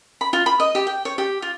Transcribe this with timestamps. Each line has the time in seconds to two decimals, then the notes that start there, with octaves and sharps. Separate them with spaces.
0.21 B5
0.33 F4
0.46 B5
0.60 D#5
0.75 G4
0.87 G5
1.05 C#5
1.18 G4
1.42 F4